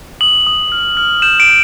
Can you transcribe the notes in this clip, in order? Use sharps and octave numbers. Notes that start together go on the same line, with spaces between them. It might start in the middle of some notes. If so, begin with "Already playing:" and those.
D#6 F#7
D#6
F6
F6
G6 E7
D7
G6